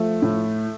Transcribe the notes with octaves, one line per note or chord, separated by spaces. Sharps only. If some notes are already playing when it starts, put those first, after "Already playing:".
Already playing: F3 A3
A2